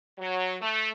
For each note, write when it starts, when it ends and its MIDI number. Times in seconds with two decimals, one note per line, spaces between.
0.19 0.55 54
0.61 0.89 57